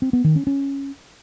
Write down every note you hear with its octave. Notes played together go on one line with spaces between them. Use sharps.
C4
B3
D#3
C#4
C#4